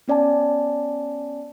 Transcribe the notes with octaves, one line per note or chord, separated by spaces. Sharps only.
B3 C#4 D5 G#5 A5